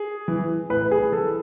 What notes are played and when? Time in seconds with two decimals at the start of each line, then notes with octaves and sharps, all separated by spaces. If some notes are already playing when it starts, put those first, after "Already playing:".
Already playing: G#4
0.28 E3
0.69 A2 B4
0.91 G#4
1.12 E3 A4